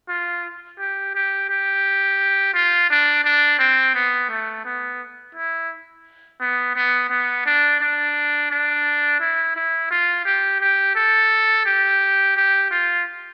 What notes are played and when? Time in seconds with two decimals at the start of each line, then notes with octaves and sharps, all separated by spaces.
0.09 F4
0.79 G4
1.15 G4
1.50 G4
2.54 F4
2.90 D4
3.24 D4
3.59 C4
3.95 B3
4.30 A3
4.65 B3
5.35 E4
6.40 B3
6.75 B3
7.10 B3
7.46 D4
7.80 D4
8.51 D4
9.20 E4
9.56 E4
9.91 F4
10.25 G4
10.60 G4
10.95 A4
11.65 G4
12.37 G4
12.71 F4